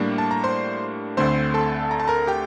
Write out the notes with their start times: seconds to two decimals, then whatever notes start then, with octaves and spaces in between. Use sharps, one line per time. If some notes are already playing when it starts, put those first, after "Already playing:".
Already playing: A2 G3 A#3 D4
0.18 A5
0.31 A#5
0.44 C5 C6
1.17 D2 D3 A3 C4 C5 C6
1.54 A4 A5
1.91 A#5
2.00 A5
2.08 A#4 A#5
2.27 G4 G5